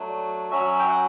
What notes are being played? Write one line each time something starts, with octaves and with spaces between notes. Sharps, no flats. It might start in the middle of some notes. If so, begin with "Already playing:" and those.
Already playing: F#3 A3 D4
F#3 C#4 F#4 E5
G5
F#5